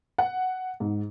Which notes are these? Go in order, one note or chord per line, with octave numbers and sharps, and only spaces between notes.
F#5
G#2